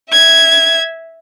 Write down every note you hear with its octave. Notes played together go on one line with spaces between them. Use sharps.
E5 G#6